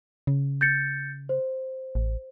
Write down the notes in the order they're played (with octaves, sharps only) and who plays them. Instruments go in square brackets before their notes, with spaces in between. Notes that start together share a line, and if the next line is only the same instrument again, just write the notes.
[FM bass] C#3
[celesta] G6 A6 C#7
C5
[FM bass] A1